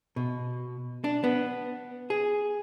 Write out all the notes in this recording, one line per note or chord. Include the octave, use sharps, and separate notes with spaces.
B2
D4
B3
G#4